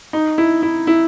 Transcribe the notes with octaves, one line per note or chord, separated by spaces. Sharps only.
D#4
E4
E4
E4